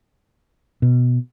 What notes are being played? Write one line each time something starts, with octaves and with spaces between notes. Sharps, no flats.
B2